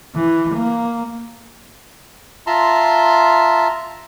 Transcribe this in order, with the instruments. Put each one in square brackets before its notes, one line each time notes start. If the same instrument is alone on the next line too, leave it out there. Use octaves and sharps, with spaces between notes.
[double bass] E3
A#3
[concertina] F4 E5 A5 A#5 C6